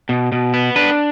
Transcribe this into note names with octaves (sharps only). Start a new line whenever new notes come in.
B2
B2
B3
D4 B4